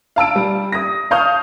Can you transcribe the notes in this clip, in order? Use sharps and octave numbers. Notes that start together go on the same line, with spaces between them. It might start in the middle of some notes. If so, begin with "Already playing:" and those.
F5 A5 E6 D7
G3
D#6 A#6
F5 A5 C#6 D#6 F6 G6